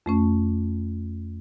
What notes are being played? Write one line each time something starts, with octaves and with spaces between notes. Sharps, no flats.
F2 A3 C#4